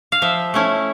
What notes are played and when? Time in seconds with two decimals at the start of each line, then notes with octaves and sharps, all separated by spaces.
0.12 F5
0.22 F3 E5
0.54 A3 C#4 E4